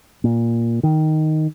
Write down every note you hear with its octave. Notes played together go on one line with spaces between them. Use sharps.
A#2
D#3